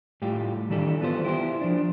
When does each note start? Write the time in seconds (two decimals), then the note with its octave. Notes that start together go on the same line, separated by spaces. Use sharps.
0.22 A2 G3 F4 G4
0.70 D#3 E3 G3 D4 G4 A4
1.01 B3 F4 A4 C5
1.25 E4 G4 C5
1.61 F3 D4